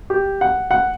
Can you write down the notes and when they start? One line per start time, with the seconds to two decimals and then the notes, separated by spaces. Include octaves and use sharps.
0.10 G4
0.41 F#5
0.71 F#5